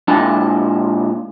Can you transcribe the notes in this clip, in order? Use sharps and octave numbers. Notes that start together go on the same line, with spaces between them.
A#2 G#3 D4 E4 A5